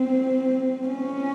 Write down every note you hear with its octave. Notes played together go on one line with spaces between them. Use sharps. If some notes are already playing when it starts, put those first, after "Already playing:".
Already playing: C4
C#4